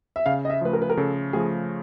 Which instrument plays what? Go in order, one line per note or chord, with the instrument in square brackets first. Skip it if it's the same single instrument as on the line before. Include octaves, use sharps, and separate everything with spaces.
[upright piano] E5
[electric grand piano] C#3 [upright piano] F5
[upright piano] D#5
E5
[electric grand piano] F3 A3 [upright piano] B4
[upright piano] A#4
B4
A#4
[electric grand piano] C#3 [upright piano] A4
[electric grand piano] F3 A3 [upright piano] G#4